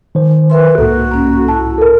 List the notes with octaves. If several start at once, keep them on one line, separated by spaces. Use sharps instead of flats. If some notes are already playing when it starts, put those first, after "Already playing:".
D#3 C5
A#4 B4 E5 C6
C2 G#2 A#3 F#4 A4
A#3 C#4
E4 A5
A4 A#4